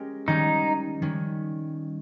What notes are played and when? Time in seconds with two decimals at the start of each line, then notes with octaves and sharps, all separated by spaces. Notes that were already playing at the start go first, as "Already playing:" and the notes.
Already playing: G#3 C#4 G4 A#4
0.27 D#3 G3 C#4 D#4
1.02 D#3 G3 C#4